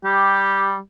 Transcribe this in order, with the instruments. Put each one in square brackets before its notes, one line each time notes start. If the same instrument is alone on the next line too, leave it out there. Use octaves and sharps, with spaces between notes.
[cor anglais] G3 [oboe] G4